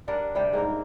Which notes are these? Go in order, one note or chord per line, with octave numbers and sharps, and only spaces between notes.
G3 D4 A#4 F#5
C3 G3 G5
G#2 A#3 C4 A#4